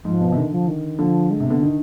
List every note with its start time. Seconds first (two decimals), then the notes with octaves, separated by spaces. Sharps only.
0.04 G#2 F3
0.20 B2
0.32 C3
0.36 D3 D#3
0.52 F3
0.68 D#3
0.99 D3 F3
1.31 G#3
1.40 C3
1.47 D3 B3
1.62 D#3 D4